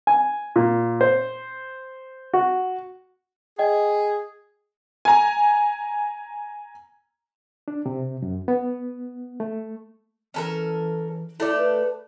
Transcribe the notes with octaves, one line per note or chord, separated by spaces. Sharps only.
G#5
A#2
C5
F#4
G#4 D#5 G5
G#5 A#5
D4
C3
F#2
B3
A3
E3 C#4 A4 A#4
A3 E4 A4 D5
B4